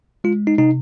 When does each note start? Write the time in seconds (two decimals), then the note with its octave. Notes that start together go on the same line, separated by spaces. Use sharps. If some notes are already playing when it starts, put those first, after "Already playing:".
0.24 G#3 F4
0.47 D#4
0.58 C3 D#4